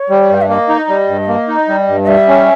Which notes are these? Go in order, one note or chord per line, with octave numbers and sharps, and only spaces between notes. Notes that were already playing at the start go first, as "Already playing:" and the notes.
Already playing: C#5
G3
G2 G5
E5
A#3 D#5
D#4
G3
G2
A#3
D#4
G3
G2
D#5
G3 E5
C#4